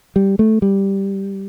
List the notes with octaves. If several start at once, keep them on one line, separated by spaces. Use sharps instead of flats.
G3
A3
G3